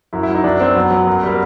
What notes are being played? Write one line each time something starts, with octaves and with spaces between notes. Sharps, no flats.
F#2 E4
E4
F#3
D#4
F#2 D4
F#3 C4
F#2 B3
F#3
F#2
G3
A#3